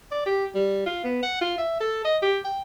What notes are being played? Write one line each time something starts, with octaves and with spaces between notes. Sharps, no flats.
D5
G4
G3
F4
B3
F#5
F4
E5
A4
D#5
G4
G5